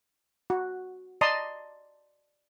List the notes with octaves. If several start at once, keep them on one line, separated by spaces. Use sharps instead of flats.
F#4
D5 D#5 A5 A#5 C6 D#6